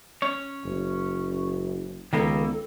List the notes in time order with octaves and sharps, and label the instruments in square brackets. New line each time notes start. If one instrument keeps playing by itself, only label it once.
[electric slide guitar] C#4 C#5
[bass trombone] F#1
[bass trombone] C#2 [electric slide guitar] D#3 A#3 B3 [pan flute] A4